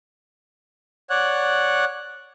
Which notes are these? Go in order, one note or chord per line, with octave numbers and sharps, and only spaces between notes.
C#5 D5 F#5 F#6